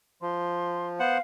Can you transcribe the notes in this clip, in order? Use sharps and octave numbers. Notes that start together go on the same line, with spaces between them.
F3 C6
B3 C5 F5 F#5